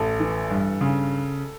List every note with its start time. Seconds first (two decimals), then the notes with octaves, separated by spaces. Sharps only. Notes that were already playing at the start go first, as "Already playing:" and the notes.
Already playing: A1 A4
0.20 E3
0.50 G2
0.81 C#3